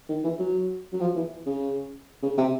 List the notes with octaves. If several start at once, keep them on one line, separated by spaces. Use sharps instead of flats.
D#3
E3
F#3
F#3
F3
E3
C#3
C#3
C3